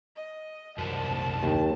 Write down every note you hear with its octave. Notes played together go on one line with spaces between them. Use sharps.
D#5
C2 F#2 A5
D#2